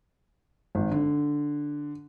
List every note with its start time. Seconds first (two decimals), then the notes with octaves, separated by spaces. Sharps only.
0.75 G#1
0.91 D3